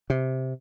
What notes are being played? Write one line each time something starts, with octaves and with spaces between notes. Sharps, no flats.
C3